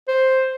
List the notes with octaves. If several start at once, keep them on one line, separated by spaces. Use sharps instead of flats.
C5